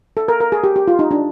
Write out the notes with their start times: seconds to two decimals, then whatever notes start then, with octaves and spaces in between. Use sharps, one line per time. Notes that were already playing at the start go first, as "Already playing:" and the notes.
0.17 A4
0.28 A#4
0.40 A#4
0.52 G#4
0.64 G4
0.76 G4
0.88 F4
0.99 D#4
1.11 D4